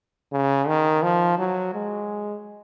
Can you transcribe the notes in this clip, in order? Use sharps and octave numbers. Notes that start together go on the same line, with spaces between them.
C#3
D#3
F3
F#3
G#3